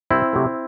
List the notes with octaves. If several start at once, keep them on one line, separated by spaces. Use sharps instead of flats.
C2 C4 E4
C3 F#3 A3